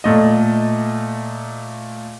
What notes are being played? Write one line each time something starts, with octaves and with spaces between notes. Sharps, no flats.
A#2 A3 D#5